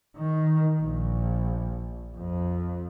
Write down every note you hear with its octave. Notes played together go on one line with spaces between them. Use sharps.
D#3
A#1
F2